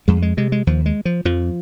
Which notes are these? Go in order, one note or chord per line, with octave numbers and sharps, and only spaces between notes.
F2 G#3
G#3
C3 G#3
G#3
D#2 F3
G#3
F3
F2 F3